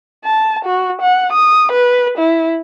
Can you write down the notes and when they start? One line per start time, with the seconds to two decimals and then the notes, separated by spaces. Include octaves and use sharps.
0.25 A5
0.65 F#4
1.02 F#5
1.33 D#6
1.72 B4
2.18 E4